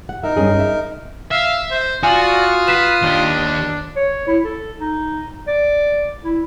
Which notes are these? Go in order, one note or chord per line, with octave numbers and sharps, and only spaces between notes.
F#5
D#4 A#4 E5
G2 C#4 G#4
E5
E5 F5
C5
F4 F#4 D5 G#5 D#6 F6
B4 B6 C7 E7
D#2 D4 G4
C#5
E4
A4
D#4
D5
E4